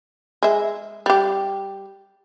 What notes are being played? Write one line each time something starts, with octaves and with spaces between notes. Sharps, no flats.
G#3 E5
G3 G4